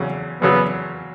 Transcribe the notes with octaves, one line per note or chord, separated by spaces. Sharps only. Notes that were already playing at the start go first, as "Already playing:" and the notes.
Already playing: E2 C#3 F#3
E2 C#3 F#3 B3